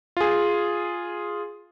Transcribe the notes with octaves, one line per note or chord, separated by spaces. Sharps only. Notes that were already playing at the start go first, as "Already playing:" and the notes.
F4 G#4